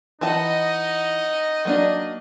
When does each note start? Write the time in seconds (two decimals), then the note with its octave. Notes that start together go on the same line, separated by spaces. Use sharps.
0.21 E3 D#4 D#5 F#5 A5
1.65 F#3 A#3 D4 D#5